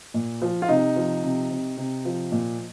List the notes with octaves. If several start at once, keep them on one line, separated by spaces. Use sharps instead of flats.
A#2
F3
F4
C3 D#4
F3
C3
C3
C3
F3
A#2